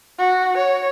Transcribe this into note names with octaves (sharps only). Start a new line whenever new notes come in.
F#4
C#5